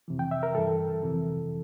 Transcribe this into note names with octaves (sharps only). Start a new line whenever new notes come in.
F2 C3 E3
G5
E5
A#4
G2 E3 A4
F2 C3 E3